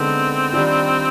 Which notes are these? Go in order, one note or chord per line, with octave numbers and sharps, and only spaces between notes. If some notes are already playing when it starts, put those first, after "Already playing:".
Already playing: D3 G#3 B3 C4 D#4
D#3 G3 D4 F4